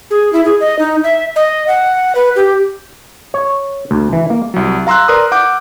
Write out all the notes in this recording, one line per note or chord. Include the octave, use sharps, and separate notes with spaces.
G#4
E4
G#4
D#5
D#4
E5
D#5
F#5
B4
G4
C#5
D2
E3
A#3
C2 F#3
F5 A#5 C6 E6 F#6
A#4 B4 D5 A#5 C6 D#6
F#5 D6 G6